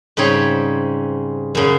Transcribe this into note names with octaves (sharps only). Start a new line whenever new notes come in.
G#2 C#3 G3 C4 C#5
F#2 C#3